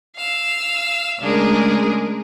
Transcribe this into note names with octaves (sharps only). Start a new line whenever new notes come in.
F5 E6
C#3 G#3 A3 D4 G#4 A#4